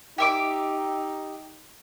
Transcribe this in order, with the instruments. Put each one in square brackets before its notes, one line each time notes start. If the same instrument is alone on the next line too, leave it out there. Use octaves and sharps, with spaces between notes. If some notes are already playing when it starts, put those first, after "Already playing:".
[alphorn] D#4 [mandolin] G4 E5 D6